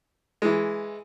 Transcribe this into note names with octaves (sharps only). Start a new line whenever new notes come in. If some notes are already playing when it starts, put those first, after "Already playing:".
E3 G#3